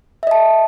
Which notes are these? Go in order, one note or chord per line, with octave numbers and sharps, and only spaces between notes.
D#5 E5 A5